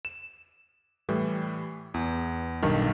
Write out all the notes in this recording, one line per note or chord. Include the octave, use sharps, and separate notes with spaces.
E7
A2 E3 G3
E2
B1 G2 D#3